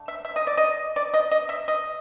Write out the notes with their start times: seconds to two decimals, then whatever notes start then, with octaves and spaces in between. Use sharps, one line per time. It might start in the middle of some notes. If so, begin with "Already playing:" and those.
Already playing: D3 A3
0.08 E5
0.25 E5
0.36 D#5
0.47 D5
0.57 D#5
0.96 D5
1.14 D#5
1.31 D#5
1.49 E5
1.68 D#5